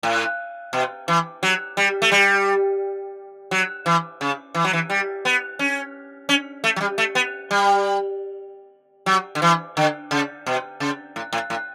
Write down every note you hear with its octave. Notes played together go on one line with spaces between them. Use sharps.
A2
B2
E3
F#3
G3
A3
G3
F#3
E3
C#3
E3
F#3
E3
G3
B3
C#4
C#4
A3
F#3
G3
A3
B3
G3
F#3
D3
E3
D3
C#3
B2
C#3
A2
A2
A2